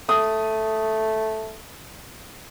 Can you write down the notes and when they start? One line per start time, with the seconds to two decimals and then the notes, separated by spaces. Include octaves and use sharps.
0.09 A3 D#6